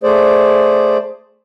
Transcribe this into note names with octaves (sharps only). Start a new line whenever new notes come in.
A3 G#4 C5 D5